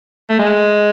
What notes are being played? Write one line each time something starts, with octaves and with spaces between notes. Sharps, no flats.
A3
G#3